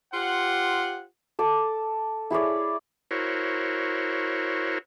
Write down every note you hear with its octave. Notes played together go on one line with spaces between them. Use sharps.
F4 G4 C5 F#5
A4 D6
E4 G#4 C#5 D5
E4 F#4 A#4 C5 C#5